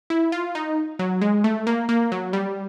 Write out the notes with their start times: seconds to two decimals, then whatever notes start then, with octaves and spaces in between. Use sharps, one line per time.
0.10 E4
0.32 F4
0.55 D#4
0.99 F#3
1.21 G#3
1.44 A3
1.67 A#3
1.89 A#3
2.12 F#3
2.33 G3